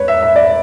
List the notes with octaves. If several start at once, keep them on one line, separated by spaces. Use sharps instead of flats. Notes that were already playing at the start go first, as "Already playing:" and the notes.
Already playing: E1 B4 C#5
E5
E5
D5